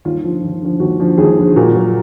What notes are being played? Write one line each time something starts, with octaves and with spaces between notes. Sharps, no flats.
D#2 F4
D3 F3
D#2
D3 F3
D#2 F#4
D3 F3
D#2 G#4
D3 F3
A#2 F#4
F#3 A#3